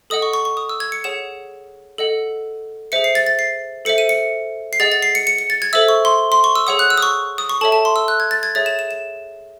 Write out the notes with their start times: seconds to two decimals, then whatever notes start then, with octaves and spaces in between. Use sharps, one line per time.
0.10 A4 D#5 F#5 D#6
0.22 C#6
0.33 C#6
0.45 C#6
0.57 D#6
0.69 E6
0.80 G#6
0.92 C#7
1.04 G#4 C#5 F#5 E7
1.98 A4 D#5 F#5
2.92 G#4 C5 E5 C#7
3.04 C7
3.15 A6
3.27 A6
3.39 C7
3.85 A4 C5 E5 C#7
3.98 D#7
4.09 C#7
4.73 C7
4.80 G#4 D#5 F#5 A6
4.92 A6
5.02 C7
5.15 C#7
5.27 C#7
5.38 C#7
5.50 A6
5.62 G#6
5.73 A4 C5 E5 E6
5.88 C#6
6.05 C6
6.32 C6
6.44 C#6
6.55 E6
6.67 G#4 C#5 F#5 D#6
6.79 F#6
6.90 E6
6.97 D#6
7.02 C#6
7.38 D#6
7.49 C#6
7.61 A4 C#5 E5 A5
7.72 A5
7.85 C6
7.96 E6
8.08 F#6
8.20 G#6
8.31 A6
8.43 G#6
8.55 G#4 C#5 E5 A6
8.66 E7
8.79 E7
8.91 E7